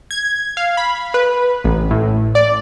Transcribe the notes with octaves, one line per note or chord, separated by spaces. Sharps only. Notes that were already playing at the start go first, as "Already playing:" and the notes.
G#6
F5
B5
B4
A1
A2
D5